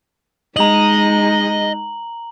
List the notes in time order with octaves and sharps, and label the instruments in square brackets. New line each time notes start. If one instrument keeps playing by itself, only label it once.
[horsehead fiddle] G#3 D#4 [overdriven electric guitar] D#5 [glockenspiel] A#5 F#7